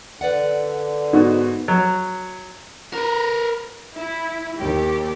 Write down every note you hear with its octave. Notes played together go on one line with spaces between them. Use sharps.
D3 B4 D5 F#5
G#2 B3 D#4 F#4
F#3
A#4 B4
E4
D#2 G4